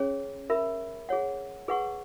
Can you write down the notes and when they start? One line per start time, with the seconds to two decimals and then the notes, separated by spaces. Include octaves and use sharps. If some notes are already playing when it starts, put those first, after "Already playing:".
Already playing: C#4 G#4 C#5
0.50 A#4 E5 B5
1.09 G#4 C#5 F#5
1.68 G#4 B4 F#5 C#6